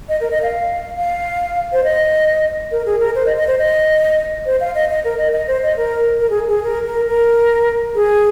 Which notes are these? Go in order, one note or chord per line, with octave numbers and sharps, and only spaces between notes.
D#5
A#4
D#5
F5
F5
C5
D#5
A#4
G#4
A#4
C5
D#5
D#5
C5
D#5
C5
F5
D#5
D#5
A#4
D#5
D#5
C5
D#5
A#4
A#4
G#4
G#4
A#4
A#4
A#4
G#4